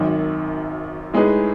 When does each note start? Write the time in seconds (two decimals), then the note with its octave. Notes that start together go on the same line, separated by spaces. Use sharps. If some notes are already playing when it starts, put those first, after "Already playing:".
Already playing: G#1 F#2 D#3
1.13 A2 G#3 D#4 G#4 B4